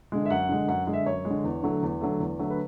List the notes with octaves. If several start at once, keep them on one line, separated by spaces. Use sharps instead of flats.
D3 G#3
E5
F#2 F#5
D3 G#3
F#2 F#5
D3 G#3
E5
F#2 C#5
G#3
D3
E2
D3 F#3 A3
E2
D3 F#3 A3
E2
D3 F#3 A3
B4